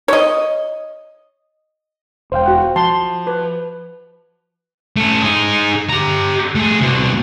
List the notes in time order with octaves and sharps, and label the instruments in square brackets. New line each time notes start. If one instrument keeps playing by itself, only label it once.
[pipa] C#5 D#5
[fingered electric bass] E1 [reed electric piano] C5 F5 G5
[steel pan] F#4 F#5
[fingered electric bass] F3 [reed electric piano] A5 [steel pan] C6
[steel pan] B4
[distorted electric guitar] A3 C#4
D#4 G#4
G4 A#5
A3 G#4
C2 B2